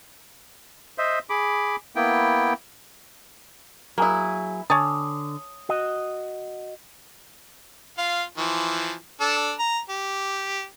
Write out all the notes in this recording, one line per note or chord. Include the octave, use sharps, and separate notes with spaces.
C5 D#5 E5
G#4 B5 D6
A#3 B3 E4 G5
F#3 A#3 E4 G#4
D3 C#5 G#5 A5 D#6
F#4 D#5
F4 F5
E3 F3
D4 A4
A#5
G4